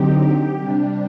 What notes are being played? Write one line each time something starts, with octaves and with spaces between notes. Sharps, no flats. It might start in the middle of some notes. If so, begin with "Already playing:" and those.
Already playing: D3 F#3 C4 D#4 G4
C3 G3 D4